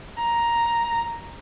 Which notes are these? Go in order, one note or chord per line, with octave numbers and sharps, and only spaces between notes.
A#5